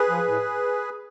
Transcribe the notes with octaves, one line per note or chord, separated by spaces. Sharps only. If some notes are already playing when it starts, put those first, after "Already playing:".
Already playing: G#4 B4
F3
A2